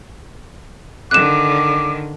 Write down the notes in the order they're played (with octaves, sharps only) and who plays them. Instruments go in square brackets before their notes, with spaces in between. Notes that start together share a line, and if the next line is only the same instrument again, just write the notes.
[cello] D3 D#3 [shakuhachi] D6 [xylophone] F#6 E7